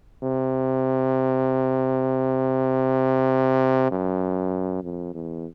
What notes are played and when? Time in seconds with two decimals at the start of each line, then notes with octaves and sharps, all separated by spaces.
0.23 C3
3.92 F#2
4.83 F2
5.14 E2